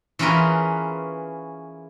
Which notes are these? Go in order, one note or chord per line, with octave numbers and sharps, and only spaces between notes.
E3 C#4 F4 G#4 A#4 B4